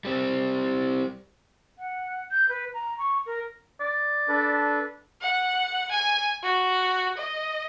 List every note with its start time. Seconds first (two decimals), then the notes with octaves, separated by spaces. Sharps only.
0.05 G3 C4
1.79 F#5
2.31 G6
2.49 B4
2.74 A#5
2.98 C#6
3.26 A#4
3.81 D5
4.29 D4 A4 B4
5.21 F#5
5.91 G#5
6.43 F#4
7.17 D#5